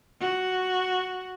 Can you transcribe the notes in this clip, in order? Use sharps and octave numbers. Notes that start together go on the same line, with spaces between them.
F#4